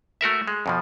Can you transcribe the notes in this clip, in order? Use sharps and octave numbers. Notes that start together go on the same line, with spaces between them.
A3 F#4 A#4 E5
G#3
F2 B2 F3